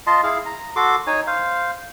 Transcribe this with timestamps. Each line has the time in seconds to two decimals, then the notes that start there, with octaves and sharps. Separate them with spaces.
0.07 F4 D#5 A5 C6
0.23 E4 G#4 F5
0.46 A#5
0.76 F#4 A4 C6 D6
1.07 D#4 C#5 G#5
1.27 C5 F5